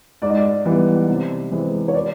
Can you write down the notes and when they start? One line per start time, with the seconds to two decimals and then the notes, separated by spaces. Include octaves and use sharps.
0.22 G#2 D5
0.30 D#5
0.37 D5
0.66 E3 G3 B3
1.08 C3
1.52 E3 G#3 C4
1.88 C#5
1.94 D5